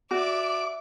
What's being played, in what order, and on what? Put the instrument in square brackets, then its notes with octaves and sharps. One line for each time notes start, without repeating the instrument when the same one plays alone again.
[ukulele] F#4 [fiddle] D5 E5 [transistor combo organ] D6